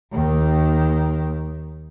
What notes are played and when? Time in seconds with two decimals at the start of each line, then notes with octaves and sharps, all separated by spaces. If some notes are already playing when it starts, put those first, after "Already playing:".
0.12 D#2 D#3